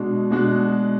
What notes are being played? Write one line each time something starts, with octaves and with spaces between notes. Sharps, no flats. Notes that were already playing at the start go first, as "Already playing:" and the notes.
Already playing: B2 G#3 D4 F#4
B2 G#3 D4 F#4